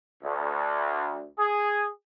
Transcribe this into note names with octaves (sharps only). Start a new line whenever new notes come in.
D2
G#4